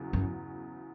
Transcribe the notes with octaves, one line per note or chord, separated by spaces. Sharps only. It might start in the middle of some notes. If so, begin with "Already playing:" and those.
Already playing: E2 C#3 F#3
F#2